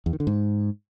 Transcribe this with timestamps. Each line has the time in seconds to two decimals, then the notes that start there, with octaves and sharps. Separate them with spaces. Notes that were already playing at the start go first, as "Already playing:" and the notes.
0.06 E2
0.13 D#3
0.20 D3
0.27 G#2